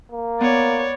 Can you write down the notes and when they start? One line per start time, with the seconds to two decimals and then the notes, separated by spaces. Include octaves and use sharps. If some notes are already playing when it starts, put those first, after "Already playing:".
0.12 A#3
0.41 B3 C#5 D5